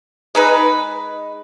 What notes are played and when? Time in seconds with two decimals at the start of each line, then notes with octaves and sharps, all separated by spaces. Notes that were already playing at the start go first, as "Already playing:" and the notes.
0.35 G#3 D#4 B4